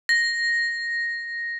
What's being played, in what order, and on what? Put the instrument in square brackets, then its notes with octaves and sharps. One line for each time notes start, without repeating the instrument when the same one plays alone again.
[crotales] A#6